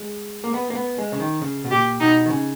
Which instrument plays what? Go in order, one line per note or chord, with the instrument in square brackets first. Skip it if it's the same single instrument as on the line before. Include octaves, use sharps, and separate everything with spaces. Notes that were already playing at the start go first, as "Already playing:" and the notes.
Already playing: [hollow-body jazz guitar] G#3
A#3
B3
A#3
B3
G#3
C#3
D#3
C#3
B2
[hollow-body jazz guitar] A#2 [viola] G4
[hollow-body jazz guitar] B2 [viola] D#4
[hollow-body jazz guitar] D#3
C#3